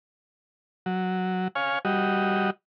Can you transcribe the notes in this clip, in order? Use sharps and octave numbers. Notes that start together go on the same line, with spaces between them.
F#3
C#5 F5 G#5
G3 F#4 D#5